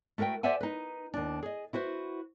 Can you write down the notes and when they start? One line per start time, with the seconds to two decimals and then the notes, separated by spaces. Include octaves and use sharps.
0.18 A3 F#4 A#4 B4 G5
0.43 G4 C5 D5 E5 F#5 G#5
0.61 D#4 B4
1.14 D#2 D4
1.43 G#4 D#5
1.73 E4 F#4 B4 C5